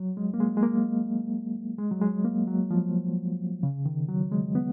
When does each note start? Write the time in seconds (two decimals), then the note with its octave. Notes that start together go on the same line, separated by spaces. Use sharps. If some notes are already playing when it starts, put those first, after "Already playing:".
Already playing: F#3
0.17 G#3
0.34 A#3
0.40 G#3
0.57 G#3
0.63 A#3
1.78 G#3
1.91 F#3
2.01 G#3
2.25 A#3
2.47 F#3
2.71 F3
3.63 C#3
3.86 D#3
4.09 F#3
4.32 G#3
4.55 B3